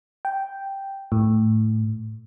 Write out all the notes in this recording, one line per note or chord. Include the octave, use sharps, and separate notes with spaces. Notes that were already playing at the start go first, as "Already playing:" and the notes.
G5
A2